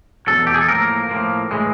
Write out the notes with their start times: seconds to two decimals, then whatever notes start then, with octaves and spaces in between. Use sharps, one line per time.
0.27 E2 B2 F#3 A4
0.47 G4
0.54 G#4
0.61 A4
0.69 A2 F3 A#3 A#4
1.09 A2 F3 A#3
1.51 A2 E3 G#3